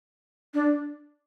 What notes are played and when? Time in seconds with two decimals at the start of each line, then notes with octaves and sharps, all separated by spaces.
0.54 D4